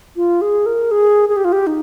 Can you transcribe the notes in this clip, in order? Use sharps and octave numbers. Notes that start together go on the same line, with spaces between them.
F4
G#4
A#4
G#4
G#4
G4
F4
G4
D#4